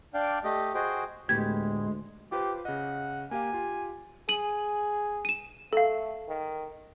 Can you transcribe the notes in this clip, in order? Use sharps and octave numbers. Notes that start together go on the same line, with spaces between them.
D4 D5 F5 G5
A3 G4 D#5
F#4 G#4 C5 D#5 G5
D2 A2 G#3 B3 G4 G#6
F4 G4 B4 C5
C#3 D#5 F#5
A#3 G4 F5 G#5
F4 G4
G#4 D#7 F#7
D#7 E7
A3 A4 F5
D#3